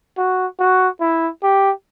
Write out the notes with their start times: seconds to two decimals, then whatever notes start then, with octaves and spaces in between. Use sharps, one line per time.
0.18 F#4
0.60 F#4
1.01 E4
1.43 G4